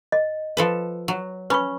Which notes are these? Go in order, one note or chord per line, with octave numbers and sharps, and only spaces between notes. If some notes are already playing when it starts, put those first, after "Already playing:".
D#5
F3 A4 B4
F#3
C#4 B4 B5 C#6